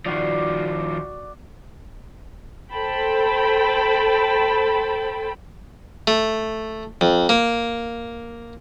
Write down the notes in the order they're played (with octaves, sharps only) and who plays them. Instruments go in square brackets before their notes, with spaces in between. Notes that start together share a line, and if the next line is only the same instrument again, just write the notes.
[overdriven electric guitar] D#3 F3 [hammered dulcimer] F#4 D5
[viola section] A4 C5 G5 A5 B5
[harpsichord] A3
F2
A#3